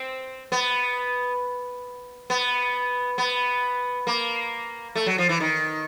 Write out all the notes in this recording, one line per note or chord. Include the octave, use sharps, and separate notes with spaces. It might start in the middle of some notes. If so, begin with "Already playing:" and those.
Already playing: C4
B3
B3
B3
A#3
A3
F#3
F3
E3
D#3